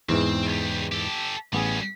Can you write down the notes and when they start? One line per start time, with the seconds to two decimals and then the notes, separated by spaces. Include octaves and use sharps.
0.09 E2 G#2 E3 C4
0.46 C#2 G3
0.92 G4 A4
1.53 A1 G3 B3 C#4 G#4